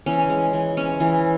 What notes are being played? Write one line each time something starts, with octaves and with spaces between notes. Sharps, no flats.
E3 C#4
G#3
E3
C#4
E3